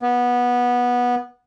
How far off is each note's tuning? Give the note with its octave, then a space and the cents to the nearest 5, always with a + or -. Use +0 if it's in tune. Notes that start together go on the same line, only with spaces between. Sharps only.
B3 -15